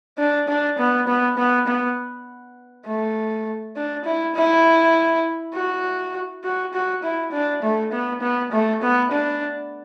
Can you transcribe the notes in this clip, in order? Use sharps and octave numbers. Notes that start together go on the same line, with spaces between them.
D4
D4
B3
B3
B3
B3
A3
D4
E4
E4
F#4
F#4
F#4
E4
D4
A3
B3
B3
A3
B3
D4